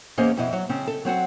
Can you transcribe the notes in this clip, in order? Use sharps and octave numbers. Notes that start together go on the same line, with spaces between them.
E2 A#3 C#4 G#4 C5 D#5
F2 B2 E4 D#5
F#3
C#3 C4 C#4
A4
F#3 C4 F#4 F#5